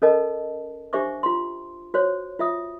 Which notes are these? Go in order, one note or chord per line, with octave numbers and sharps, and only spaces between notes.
C#4 A4 A#4 D#5 A5
D4 G4 C5 E5 C#6 D6
F4 C6
F#4 C5 C#5
F4 E5 D#6